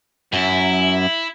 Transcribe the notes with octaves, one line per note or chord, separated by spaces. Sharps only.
F#2 E4